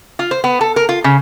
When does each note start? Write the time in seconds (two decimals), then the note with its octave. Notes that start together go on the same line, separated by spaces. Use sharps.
0.19 F4
0.31 C5
0.44 B3
0.61 A4
0.76 A#4
0.89 F4
1.04 C#3